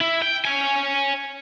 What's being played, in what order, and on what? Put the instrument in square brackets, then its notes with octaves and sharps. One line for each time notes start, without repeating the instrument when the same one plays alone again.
[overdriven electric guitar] E4
G5
C#5 G#5